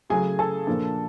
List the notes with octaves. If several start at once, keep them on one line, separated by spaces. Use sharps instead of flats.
C#3 F#3 A3 G#4 G#5
A4 A5
A#2 F3 A#3 D4